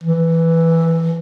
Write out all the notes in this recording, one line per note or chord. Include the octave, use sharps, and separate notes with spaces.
E3